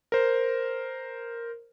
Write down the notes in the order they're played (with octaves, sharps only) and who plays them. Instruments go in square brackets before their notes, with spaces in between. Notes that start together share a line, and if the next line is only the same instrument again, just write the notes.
[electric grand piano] A#4 C5